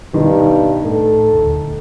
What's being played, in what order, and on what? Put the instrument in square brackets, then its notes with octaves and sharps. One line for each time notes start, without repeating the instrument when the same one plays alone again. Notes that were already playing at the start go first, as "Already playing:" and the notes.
[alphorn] G2 [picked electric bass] B2 [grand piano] D#3
[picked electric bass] A2 [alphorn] A4
[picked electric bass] D#1 D2